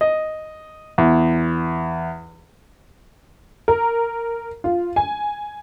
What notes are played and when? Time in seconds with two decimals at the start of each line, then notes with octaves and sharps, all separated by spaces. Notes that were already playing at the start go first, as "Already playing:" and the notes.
0.01 D#5
0.98 E2
3.68 A#4
4.64 F4
4.96 G#5